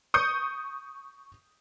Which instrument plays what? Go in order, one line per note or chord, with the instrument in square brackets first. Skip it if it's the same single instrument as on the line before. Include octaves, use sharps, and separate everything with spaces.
[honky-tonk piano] C#6 D#6 G6 C#7